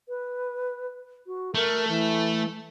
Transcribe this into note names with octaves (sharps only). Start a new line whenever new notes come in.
B4
F#4
A3 A#4
E3